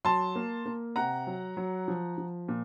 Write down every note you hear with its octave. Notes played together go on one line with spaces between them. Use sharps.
F#3 A5 C6
A#3
A#3
C3 F#5 A#5
F#3
F#3
F3
F3
A#2